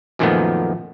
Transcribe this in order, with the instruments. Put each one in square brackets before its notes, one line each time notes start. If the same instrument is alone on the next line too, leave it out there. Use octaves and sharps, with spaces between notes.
[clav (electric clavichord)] F#2 A#2 D#3 F3 A3 B3